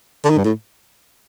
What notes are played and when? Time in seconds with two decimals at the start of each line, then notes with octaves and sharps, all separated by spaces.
0.25 D3
0.30 D#3
0.38 G2
0.45 A2